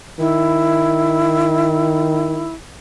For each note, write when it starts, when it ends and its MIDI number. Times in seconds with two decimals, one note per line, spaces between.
0.19 2.51 51
0.19 2.52 64